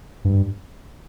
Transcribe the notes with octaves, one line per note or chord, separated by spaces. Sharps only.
G2